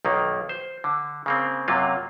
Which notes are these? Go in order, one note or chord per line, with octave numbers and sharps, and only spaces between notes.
B1 D#3 A#3
C5
D3
C#3 A#3 C4
F#2 C3 F#3 A#3 F4